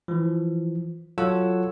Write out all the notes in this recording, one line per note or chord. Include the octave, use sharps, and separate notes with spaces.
E3 F3
F#3 F4 A4 C#5 F#5 E6